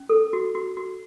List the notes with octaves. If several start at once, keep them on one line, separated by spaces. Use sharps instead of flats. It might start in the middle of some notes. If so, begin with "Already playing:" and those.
Already playing: C#4
A4
F#4
F#4
F#4